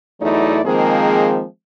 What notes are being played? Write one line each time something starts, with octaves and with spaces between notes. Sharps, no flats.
E2 F#3 A3 D#4 E4 D5
D#3 F3 G#3 A#3 C4 G#4